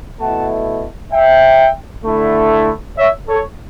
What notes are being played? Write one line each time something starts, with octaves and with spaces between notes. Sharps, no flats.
B2 A3 E4 F#5 A5
E5 G5
D3 A3 E4
C#5 E5
A4 C#5